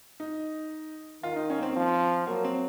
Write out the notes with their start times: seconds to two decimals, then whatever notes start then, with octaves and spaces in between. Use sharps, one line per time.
0.20 D#4
1.23 D#3 F4
1.36 D#4
1.50 C#4
1.58 A#3
1.63 C4
1.76 F3
2.27 F#3 A#3
2.44 C4